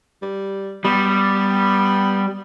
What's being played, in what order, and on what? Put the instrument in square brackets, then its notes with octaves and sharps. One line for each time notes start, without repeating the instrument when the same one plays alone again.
[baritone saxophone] G3
[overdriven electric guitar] G3 [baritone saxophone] B3